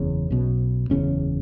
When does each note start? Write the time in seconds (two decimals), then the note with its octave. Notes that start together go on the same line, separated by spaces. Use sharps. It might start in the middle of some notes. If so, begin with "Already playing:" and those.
Already playing: F#1 E2 C#3 C#4
0.30 B1 B2
0.90 F#1 E2 C#3 C#4